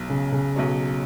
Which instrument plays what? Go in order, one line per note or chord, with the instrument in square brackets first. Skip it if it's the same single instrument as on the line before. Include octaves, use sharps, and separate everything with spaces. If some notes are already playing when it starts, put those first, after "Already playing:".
Already playing: [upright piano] B1 B2 F#3
[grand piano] C#3
C#3
[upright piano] B1 B2 F#3